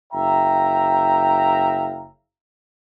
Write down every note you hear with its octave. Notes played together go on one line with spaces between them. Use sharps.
F#1 E5 F5 G5 A#5